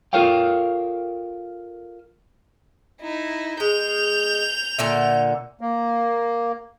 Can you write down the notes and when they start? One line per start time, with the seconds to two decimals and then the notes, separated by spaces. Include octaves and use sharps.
0.13 F4 A4 A#4 C#5 F5 G5
3.01 D#4 E4
3.60 G#3 G6 F7
4.79 A#2 D3 E5
5.61 A#3